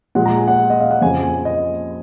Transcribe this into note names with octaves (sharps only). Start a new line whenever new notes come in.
A#2 F3 G#3 F#5
A#5
G#5
F#5
D#5
F5
F#5
F2 C#3 F3 G#5
G#5
D#5